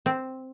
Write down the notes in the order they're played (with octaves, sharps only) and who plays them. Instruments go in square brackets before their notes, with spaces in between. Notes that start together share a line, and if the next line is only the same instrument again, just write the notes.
[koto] C4